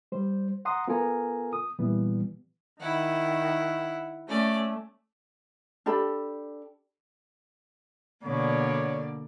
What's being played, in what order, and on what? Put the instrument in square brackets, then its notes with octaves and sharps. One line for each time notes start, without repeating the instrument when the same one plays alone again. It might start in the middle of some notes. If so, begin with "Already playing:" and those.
[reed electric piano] G3 C5
F#5 A#5 C6 D#6
B3 F4 A4 A#4 G#5 A#5
D#6
A#2 E3 G3 B3
[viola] D#3 [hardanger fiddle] E4 F#5
[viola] A3 [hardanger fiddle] C#4 D5
[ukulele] D4 G4 A4 B5
[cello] B2 [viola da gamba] D3 A#3 D5 [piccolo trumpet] C#5